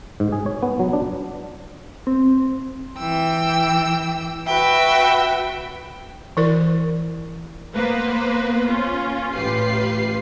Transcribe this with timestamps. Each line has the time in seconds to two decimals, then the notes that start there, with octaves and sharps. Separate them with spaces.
0.20 G#2
0.32 G#4
0.46 C#5
0.63 B3
0.79 F#3
0.93 D4
2.07 C4
2.98 E3 G5 E6
4.47 F#4 B4 E5 G5
6.37 E3 E4 A#4 D5
7.74 A#3 B3 B4 C5
8.68 C#4 F4
9.34 A1 F4 G4 B4 C7